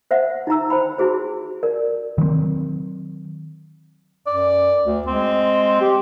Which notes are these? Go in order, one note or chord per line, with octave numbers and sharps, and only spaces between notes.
C5 E5 F#5
D#4 E4 A#5 E6
C5 G5 B5
E4 F#4 G#4 C5
A#4 D5
D#3 F#3 G#3 C4
F#2 D5
D2
G#3 C4
G4